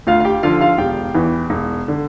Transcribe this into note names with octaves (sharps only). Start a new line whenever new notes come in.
D2 F4 F5
F5
G4 G5
D3 F3 F4 F5
F4 F5
E1 G4 G5
E2 E3
E1
D3